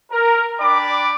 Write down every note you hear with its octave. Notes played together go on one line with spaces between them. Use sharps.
A#4
D4 D5 G5 B5 D6